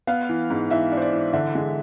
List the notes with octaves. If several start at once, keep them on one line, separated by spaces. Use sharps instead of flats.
B3 F5
E3
G#2
E3 E5
D4
C5
D5
E3
D3 E5
G#3